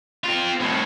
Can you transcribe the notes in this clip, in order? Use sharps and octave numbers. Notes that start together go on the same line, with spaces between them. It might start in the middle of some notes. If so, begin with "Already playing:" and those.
C4 F4
C2 A2